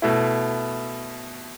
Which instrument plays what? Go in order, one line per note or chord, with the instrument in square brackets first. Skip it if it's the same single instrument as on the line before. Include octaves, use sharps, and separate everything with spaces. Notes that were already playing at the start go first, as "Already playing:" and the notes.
[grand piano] B2 A3 E4